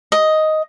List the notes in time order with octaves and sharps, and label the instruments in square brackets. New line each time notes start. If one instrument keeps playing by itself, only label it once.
[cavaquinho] D#5